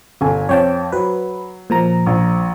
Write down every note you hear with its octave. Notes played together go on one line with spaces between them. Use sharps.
G1 A4 G#5
F2 C#5 G5 A5
F#3 B4
A#2 F3 A#5
A#1